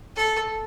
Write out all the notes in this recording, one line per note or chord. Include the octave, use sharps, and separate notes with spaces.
A4